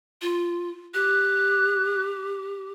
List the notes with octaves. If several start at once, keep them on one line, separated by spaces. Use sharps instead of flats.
F4
G4 F#6